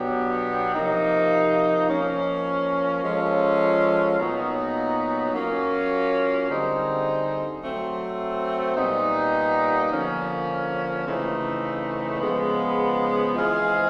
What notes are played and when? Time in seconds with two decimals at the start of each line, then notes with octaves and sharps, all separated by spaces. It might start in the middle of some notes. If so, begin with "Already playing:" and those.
Already playing: B2 F#3 B3 D4 G4
0.75 C3 F3 A#3 D#4
1.89 F3 A#3 C#4
3.03 F3 G#3 C#4 F4 A4
4.19 A#2 F#3 B3 D#4
5.33 F#3 A#3 C#4 F4
6.48 D3 G3 C4 D#4 G#4
7.62 F#3 A3 C4
8.77 A#2 G3 B3 D#4
9.92 D3 F3 A#3 C#4
11.06 C#3 E3 A3 C4 D#4
12.20 C#3 F3 G#3 B3
13.35 E3 G#3 C4 F4 G#4